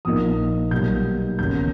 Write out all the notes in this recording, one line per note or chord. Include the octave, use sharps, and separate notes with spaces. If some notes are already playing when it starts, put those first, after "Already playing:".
A#1 A#2 A#3 D#4 D#6
B1 B2 G3 A#3 G6
E1 D#2 C#3 G6